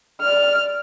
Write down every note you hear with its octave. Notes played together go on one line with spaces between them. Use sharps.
D5 F6